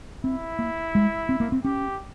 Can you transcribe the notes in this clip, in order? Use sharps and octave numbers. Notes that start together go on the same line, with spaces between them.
C4 E4
A#3
G#3
C4
A#3
C4
C#4 G4